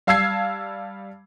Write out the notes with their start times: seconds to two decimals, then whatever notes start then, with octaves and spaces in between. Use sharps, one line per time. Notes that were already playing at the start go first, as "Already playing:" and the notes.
0.07 G3 F5 A5 E6 G#6 C7